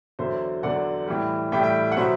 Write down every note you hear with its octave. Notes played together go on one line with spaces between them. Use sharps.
E2 D3 F#3 C5 E5
E2 D3 F#3 D5 F#5
A2 E3 G3
A2 E3 G3 E5 G5
E5 G5
F#5
B2 F#3 C5 E5